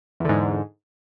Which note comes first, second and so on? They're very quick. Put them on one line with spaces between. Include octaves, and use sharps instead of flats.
E2 D3 G#2